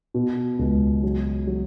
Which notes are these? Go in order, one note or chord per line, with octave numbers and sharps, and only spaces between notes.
B2
C#2
F#3
F#3